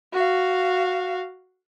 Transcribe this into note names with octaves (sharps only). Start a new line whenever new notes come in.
F#4 F5